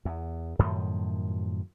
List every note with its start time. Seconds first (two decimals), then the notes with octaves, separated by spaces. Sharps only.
0.05 E2
0.59 F#2 A2 D#3 F3